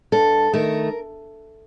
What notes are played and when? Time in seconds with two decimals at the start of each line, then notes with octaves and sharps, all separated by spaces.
0.12 G2 A4
0.53 D#3 A3 A#4